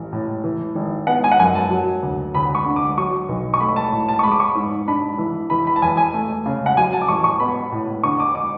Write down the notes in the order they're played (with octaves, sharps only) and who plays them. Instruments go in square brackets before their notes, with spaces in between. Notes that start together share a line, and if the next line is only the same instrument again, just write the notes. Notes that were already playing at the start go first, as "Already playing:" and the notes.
Already playing: [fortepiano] A1
A2
E3
G#1
B3 F#5
G#5
F#5
F#2 G#5
A5
F#3
D2
D2 B5
C#6
D3
D6
F#3 C#6
B1
C#6
A3 B5
A5
A2
A5
C#6
G#3 B5
D6
C#6
G#2
D4 B5
E3
E3 B5
B5
A5
E2 G#5
G#5
A3
C#3
F#5
F#3 G#5
A5
D6
A1 C#6
C#6
B3 B5
A2
D3 C#6
D6
D6